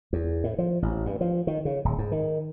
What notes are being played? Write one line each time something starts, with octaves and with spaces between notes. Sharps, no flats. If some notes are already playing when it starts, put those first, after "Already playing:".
E2
A2
F3
A1
G2
F3
D#3
C#3
D1
G#2
D#3